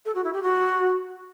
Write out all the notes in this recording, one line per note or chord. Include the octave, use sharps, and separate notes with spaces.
A4
F#4
E4
G4
F#4